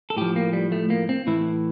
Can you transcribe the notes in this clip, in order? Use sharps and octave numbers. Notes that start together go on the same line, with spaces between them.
A4
A2 F3 G4
A#3
G3
A3
A#3
C4
A2 E3 E4